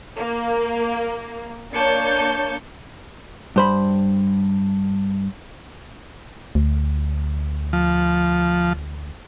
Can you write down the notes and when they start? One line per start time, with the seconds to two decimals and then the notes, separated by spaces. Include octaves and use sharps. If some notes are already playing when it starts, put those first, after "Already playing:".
0.17 A#3
1.73 A#3 D4 C#5 A5 G6 C#7
3.56 G2 C5 B5
6.55 D2
7.73 F3